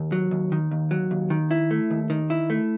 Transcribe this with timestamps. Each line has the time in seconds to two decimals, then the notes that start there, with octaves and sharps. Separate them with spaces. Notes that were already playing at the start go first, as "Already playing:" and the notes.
Already playing: D#2
0.12 F#3
0.31 D#2
0.52 D#3
0.71 D#2
0.91 F#3
1.11 D#2
1.30 D#3
1.51 E4
1.71 A3
1.90 D#2
2.10 D#3
2.30 E4
2.50 A3